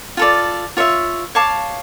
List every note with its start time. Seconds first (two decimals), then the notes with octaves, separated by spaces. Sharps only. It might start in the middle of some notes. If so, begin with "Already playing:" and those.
0.17 F4 A4 D5
0.77 F4 C#5 E5
1.35 C#5 F5 A5 D6